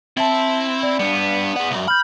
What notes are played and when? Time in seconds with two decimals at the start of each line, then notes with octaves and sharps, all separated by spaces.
0.17 C4 E4 E5 A5
0.83 D5
1.00 G3 B3 D4
1.57 G#4 F#5
1.71 C2 F#2
1.88 B5 F6 G6